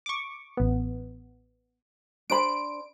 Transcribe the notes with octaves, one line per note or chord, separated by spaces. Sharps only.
C#6 D6
A1 B3
D4 C5 B5 D7